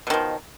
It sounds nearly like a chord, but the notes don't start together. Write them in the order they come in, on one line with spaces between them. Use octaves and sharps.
B2 D#3 F3